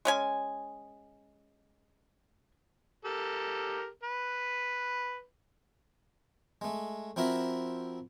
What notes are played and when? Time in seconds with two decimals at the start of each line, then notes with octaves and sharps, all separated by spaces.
0.05 G#3 C#4 G#5
3.05 G4 A4 A#4
4.03 B4
6.61 G#3 A3
7.16 F3 C4 E4 F#4 A#4 E5